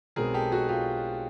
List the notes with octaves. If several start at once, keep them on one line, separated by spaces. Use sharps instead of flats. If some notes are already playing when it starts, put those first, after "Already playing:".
B1 B2 G#3 C4 G#4 A#4
G4 A4
F#4 G#4
F4 G4